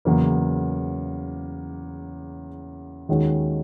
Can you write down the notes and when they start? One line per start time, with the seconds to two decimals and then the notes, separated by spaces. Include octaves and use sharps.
0.05 E2 C#3 F#3 A#3
3.09 D#2 D#3 G#3 C#4 F#4